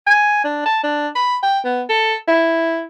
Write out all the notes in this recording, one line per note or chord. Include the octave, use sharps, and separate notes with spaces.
G#5
D4
A5
D4
B5
G5
B3
A4
E4